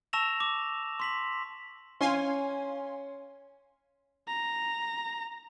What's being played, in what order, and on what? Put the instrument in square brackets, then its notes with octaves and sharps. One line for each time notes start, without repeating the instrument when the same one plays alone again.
[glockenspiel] A5 C#6 E6 A#6 E7 F7
D6
C6 B6 F#7
[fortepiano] C#4 [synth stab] F5 G#5 C6
[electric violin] A#5